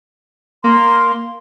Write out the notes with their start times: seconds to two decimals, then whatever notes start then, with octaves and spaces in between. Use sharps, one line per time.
0.64 A#3 C6